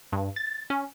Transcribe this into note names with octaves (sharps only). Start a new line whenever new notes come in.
G2
A6
C#4